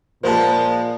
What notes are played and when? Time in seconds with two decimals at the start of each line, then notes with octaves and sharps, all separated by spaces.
0.23 A#2 F3 G#3 A#3 B3 A#4 C5 A5